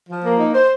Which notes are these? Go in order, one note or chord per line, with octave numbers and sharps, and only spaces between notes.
F3
A#3
D#4
C5